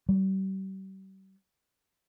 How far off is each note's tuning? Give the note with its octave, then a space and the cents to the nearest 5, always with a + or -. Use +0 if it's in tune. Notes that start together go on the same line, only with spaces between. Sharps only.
G3 -40